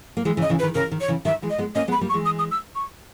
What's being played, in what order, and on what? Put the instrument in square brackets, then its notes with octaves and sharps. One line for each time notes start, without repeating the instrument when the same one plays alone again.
[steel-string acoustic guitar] A#3
E3 G#3
C#3 E3
[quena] D#5
[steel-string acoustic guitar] C#3 E3
[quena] B4
[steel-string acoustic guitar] D#3
[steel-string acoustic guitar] C#3 [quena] A#4
[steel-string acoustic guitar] D#3
[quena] C#5
[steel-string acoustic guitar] C#3 E3
[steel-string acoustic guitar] D#3 G3 [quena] E5
[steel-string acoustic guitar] E3 G#3
[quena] D#5
[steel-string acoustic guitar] G#3 B3
[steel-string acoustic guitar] A#3 C#4 [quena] D#5
[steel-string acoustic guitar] G#3 B3
[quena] B5
[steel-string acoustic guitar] G3 A#3
[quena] C#6
[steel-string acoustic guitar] E3 G#3
[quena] D#6
D#6
E6
C#6